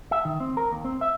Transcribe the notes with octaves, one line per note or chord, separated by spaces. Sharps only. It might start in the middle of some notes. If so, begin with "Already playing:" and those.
E5
D#3
C4
A#4
D#2
C4
E5